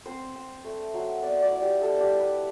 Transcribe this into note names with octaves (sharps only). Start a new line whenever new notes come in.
C4 C5
C4
A3
F#3
B3 D5
D5
E4
G4
G3 A4
G4
E4
B4